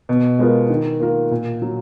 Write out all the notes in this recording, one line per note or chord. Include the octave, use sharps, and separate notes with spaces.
B2
G#3 B3 F4 A#4
D#3
A#3 F4 A#4
A#2
F#3